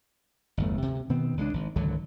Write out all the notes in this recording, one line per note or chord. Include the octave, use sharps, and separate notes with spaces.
G1 E2 A3
D2 C3
B2 D#3 B3 C4
C#2 G#3 A3 D4
G#1
G#1 C#2 D3 F#3